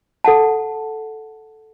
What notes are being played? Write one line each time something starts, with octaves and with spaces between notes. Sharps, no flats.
A4 F#5 A5